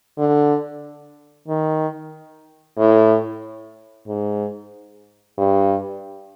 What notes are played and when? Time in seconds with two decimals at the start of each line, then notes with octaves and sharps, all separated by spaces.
0.18 D3
1.48 D#3
2.78 A2
4.08 G#2
5.38 G2